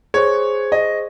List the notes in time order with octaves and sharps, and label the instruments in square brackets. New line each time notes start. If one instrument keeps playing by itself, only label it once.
[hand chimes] G#4 C5 C#6 [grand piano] C#5
[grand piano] D#5